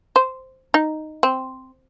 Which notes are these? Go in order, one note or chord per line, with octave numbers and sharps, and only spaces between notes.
C5
D#4
C4